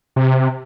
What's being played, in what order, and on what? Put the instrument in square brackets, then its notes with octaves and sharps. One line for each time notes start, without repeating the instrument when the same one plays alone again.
[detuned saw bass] C3